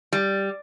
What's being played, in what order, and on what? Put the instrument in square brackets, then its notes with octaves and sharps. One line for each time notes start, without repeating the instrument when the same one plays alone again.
[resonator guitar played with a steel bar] G3